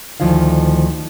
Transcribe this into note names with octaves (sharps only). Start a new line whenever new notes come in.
D2 D#3 F3 E4 F5